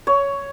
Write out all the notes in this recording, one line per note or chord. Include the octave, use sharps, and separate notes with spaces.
C#5